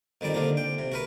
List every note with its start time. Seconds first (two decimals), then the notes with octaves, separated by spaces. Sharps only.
0.21 F2 D#3 G3 D5 A#5
0.34 D3 F3 A#3 C4 D4
0.57 G5
0.79 C3
0.92 F#4 A#4 B4